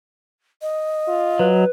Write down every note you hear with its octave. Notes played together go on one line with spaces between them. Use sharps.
D#5
F4
F#3 B4